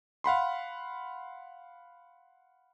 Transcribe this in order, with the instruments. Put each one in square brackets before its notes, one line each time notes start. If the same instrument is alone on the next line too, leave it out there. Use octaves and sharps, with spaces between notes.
[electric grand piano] F5 F#5 B5 C6